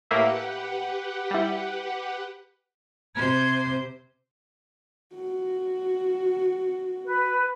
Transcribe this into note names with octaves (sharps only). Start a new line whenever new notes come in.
A2 A#3 G4 B4 E5 F#5
G3 E4
C3 C5 G#6
F#4
B4